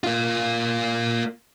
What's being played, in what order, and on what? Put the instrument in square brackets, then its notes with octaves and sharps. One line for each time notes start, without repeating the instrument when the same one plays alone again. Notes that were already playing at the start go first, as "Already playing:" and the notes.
[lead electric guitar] A#3 F4